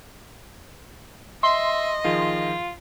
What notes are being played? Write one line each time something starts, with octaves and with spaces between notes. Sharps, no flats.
D#5 E5 C6
D#3 F3 F4 G#4